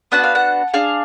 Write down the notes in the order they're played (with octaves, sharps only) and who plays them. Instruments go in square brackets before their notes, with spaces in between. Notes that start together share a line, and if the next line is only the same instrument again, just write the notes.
[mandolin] B3 D4 F#4 F#5
F5
F#5
D4 G#4 F5